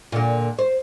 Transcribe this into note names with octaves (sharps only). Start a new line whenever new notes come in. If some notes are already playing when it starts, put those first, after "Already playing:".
A#2 D3
C5